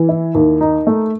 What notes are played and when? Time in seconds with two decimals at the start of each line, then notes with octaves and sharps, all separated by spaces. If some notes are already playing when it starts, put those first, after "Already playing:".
Already playing: E3
0.09 E4
0.35 D#2
0.61 D#4
0.87 A3